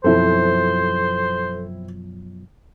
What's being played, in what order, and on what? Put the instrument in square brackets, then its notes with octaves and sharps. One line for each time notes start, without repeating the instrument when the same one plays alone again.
[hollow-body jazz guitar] F#2 B2 F3 [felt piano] C4 E4 [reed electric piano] A4 [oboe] C5